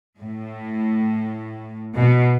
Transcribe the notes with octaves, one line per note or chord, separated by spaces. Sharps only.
A2
B2